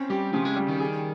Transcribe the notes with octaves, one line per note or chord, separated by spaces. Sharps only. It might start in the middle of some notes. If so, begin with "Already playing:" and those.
Already playing: C4 C#4
G3 G4
C#3 F3
G#3
G3
D#3
G#4